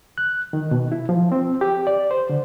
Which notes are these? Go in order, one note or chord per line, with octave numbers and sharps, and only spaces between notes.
F#6
D#3
B2
E4
F3
C4
G4
D5
C5
D3